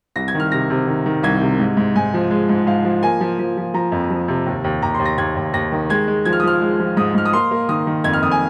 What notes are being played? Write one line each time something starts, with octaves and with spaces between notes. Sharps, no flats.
C2 A#6
G#6
D#3
F6
C3 A#6
C3
D#3
D#3
C2 G#6
C3
G#2
G#2
G#2 G#5
F3
G#3
G#2
G#2 F5
F3
A#3 G#5
F3
F3
F3
F3 A#5
F2
F3
C3
D#2
D#2
D#2 A#5
D#2 C6
A#6
D#2 G#6
D#2
D#2 A#6
D#3
G#3 G#6
G#3
F3 G#6
F6
D#6
F3 F6
G#3
F3
G#2 D#6
G#2 F6
D#6
A#3 C6
A#3
D#3 D#6
D#3
F2 G#6
F6
F2 D#6
G#5